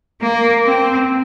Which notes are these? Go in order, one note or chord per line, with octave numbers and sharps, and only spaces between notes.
A#3
C4